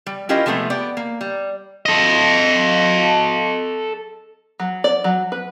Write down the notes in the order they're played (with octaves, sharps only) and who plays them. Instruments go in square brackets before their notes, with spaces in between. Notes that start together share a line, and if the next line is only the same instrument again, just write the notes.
[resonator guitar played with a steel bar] G3
C#4 E4 F4 G4 A#4 D#5
C3 F3 G#3 A3 B3
B3 G4 D5
A#3
G3
[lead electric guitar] A4 D#5
[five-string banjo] F#3
D5
F#3
B4